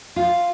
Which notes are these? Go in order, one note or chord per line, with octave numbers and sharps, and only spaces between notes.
F4